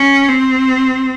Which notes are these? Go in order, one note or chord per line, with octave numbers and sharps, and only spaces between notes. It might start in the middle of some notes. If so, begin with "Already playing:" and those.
Already playing: C#4
C4